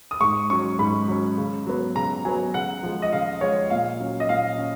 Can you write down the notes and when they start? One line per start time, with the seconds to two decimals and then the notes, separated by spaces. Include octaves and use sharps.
0.11 D#6
0.21 G#2 C#6
0.50 F#3 C#4 C#6
0.79 G#2 B5
1.08 F#3 C#4
1.38 C#3
1.66 F#3 B3
1.96 C#3 A#5
2.25 F#3 B3 G#5
2.54 C#3 F#5
2.83 F3 G#3
3.02 D#5
3.12 C#3 F5
3.41 F3 G#3 C#5
3.70 A#2 F5
4.00 F#3 C#4
4.20 D#5
4.29 A#2 F5
4.58 C#4